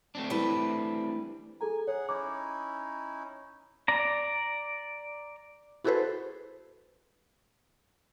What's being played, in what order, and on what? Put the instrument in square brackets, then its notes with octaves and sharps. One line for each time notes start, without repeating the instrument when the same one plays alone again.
[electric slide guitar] A3 C4 D4
[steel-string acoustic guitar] E3 G3 B4
[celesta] G#4 A4 A#5 [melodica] G#5
[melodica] G#4 F#5 [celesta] C#5
[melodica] C#4 D#4 E4 [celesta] D6
[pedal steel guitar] D5 A#5
[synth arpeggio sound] E4 F#4 G#4 A4 B4 C5